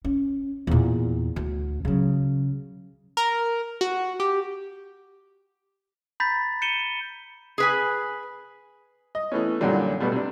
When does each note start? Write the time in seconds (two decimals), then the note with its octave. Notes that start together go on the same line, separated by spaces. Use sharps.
0.05 C#4
0.67 E2 A#2
1.36 D2
1.85 C#3 F#3
3.17 A#4
3.81 F#4
4.20 G4
6.20 A#5 B5 G6 A6 B6
6.62 G6 C#7 D#7 E7 G7
7.58 G#4 B4 G#5
9.15 D#5
9.32 E3 A3 B3 C#4
9.61 F#2 A#2 D3 E3 F#3 G3
10.00 B2 G3 A3 B3
10.12 C3 D4